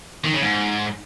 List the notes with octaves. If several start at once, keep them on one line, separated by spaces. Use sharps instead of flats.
D#3
C#3
G#2